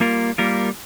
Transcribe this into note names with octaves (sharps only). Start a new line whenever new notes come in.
G3 A#3 F4 A#4
G3 A#3 F4 A#4